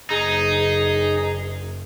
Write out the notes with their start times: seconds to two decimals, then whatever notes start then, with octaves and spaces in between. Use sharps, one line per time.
0.10 F#1 D#4 G#4